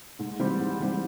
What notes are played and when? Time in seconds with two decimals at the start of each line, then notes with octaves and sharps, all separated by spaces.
0.19 G#2
0.39 E3 G3 C4
0.60 G#2
0.80 E3 G3 C4